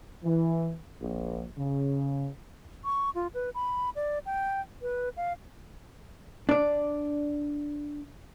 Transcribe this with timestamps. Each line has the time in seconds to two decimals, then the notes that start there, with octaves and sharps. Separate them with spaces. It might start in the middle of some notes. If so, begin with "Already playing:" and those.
0.24 E3
1.00 A#1
1.57 C#3
2.84 C#6
3.15 F4
3.34 B4
3.54 B5
3.96 D5
4.26 G5
4.82 B4
5.17 F5
6.49 D4 D5